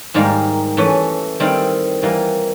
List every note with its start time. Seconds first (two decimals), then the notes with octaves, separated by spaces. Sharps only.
0.14 G#2 D#3 G3 A#3
0.77 E3 A3 C#4
1.40 D#3 G3 C4 E4
2.02 E3 G3 A#3